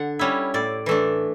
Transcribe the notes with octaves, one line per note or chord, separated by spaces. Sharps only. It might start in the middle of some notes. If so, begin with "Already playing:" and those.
Already playing: D3 F#5
G3 C#4 E4
A2 D5
E3 A3 D4